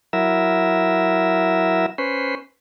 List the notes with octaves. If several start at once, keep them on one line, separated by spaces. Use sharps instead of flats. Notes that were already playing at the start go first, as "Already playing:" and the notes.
F#3 E4 A#4 E5
C#4 B4 C5